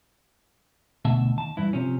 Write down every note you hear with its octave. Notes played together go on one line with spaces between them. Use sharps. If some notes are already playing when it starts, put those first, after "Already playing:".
D2 B2 E5 A5
D#2 A5
G2 E3 E4
C3 F3 C#4